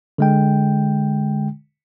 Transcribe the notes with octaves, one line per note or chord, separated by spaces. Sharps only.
D3 G#3 G5